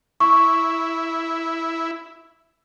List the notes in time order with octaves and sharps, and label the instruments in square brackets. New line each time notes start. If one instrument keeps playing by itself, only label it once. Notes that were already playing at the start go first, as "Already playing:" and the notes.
[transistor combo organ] E4 [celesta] C#6